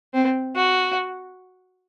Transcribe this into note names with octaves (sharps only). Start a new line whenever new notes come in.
C4
F#4